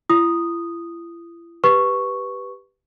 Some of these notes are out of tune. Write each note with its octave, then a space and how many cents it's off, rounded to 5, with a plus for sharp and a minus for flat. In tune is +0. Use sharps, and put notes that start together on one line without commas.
E4 +45 D#6 -5
G4 +0 B4 +0 C#6 +0